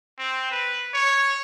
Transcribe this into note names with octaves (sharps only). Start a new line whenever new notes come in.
C4
B4
C#5